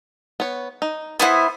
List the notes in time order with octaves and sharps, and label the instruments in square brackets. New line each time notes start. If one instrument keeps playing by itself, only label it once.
[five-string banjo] B3 C#5
D#4
[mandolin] B3 E4 C5 [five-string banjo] G#4 F#5